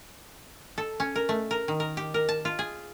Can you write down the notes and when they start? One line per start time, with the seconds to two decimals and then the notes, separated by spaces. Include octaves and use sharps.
0.78 A4
1.00 C#4
1.16 A#4
1.29 A3
1.51 A#4
1.68 D#3
1.80 A#4
1.97 G4
2.14 A#4
2.29 A5
2.45 F4
2.59 G#4